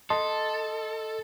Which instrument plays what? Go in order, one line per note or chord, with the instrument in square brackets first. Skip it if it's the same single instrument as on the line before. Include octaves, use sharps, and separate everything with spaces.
[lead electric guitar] A4 [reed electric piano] D#5 A5 C6